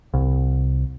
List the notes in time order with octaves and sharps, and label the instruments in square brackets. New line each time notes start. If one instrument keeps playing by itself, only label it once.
[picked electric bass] C2